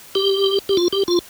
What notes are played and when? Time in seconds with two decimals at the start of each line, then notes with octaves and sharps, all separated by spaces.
0.15 G4
0.69 G4
0.77 F4
0.93 G4
1.08 F4